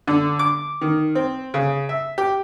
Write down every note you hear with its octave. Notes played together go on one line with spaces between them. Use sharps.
D3
D6
D#3
C4
C#3
E5
G4